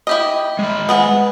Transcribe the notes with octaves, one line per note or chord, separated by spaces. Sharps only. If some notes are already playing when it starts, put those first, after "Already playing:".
E4 G4 D#5
G#3 B5
B3 G#4 F#5